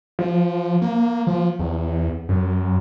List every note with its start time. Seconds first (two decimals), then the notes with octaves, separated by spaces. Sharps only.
0.19 F3
0.82 A#3
1.27 F3
1.59 E2
2.29 F#2